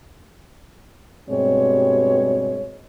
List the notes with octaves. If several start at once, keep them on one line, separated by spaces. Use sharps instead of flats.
G2 B2 G3 G#3 C4 C#5